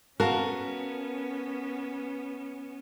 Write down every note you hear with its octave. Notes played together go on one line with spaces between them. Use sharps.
B3 C#4 F#4 A#4 F5 A5